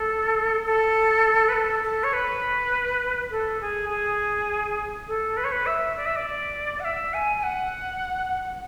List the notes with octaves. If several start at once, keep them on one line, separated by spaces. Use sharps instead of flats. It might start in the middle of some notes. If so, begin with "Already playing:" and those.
Already playing: A4
A4
B4
A4
A4
C#5
B4
A4
G#4
G#4
A4
B4
C#5
B4
E5
D5
E5
D5
F#5
E5
G#5
G#5
F#5